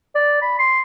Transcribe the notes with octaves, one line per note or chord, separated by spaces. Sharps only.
D5
B5
C6